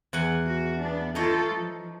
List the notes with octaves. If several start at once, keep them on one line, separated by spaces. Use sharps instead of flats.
E2 F#5 G#5
F#4
B3 D4
D#4 F4 A4 C#5 D#5
F3